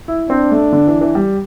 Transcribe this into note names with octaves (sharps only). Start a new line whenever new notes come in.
E4
C4 D4
A3
D3
E3
E3
G3